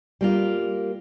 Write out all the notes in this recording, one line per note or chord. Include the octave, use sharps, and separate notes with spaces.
G3 A#3 F4